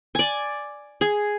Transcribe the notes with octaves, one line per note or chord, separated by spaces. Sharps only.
D5 G#5
G#4